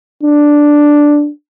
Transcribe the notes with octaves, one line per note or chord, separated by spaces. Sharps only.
D4